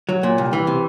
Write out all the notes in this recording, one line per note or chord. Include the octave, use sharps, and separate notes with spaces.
F#3
A#2
C2
E3
C3